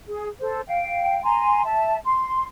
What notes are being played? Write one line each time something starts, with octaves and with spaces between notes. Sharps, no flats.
G#4
A4 C5
F5 G5
G#5 A#5 C6
E5 A5
C6